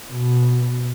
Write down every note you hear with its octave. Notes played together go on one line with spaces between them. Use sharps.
B2